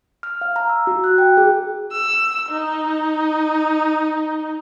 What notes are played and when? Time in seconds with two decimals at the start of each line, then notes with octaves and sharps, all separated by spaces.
0.23 F6
0.41 F5
0.56 A#5
0.69 E6
0.87 F#4
1.04 F#6
1.18 G5
1.37 G#4
1.92 E6
2.50 D#4